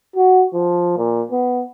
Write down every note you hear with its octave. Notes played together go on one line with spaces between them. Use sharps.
F#4
F3
A#2
B3